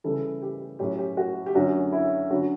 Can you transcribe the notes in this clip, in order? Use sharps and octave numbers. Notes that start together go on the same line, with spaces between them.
C#3 E3 G3 A4
G4
A2 F#3 C#4 G4
G4
F#4
G4
F#2 D3 F#3 C#4 F#4
E4
D3 F#3 C#4 F#4